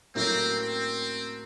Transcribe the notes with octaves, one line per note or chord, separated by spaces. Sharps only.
A2 F#3 A#3 C4 C#4 E4
C4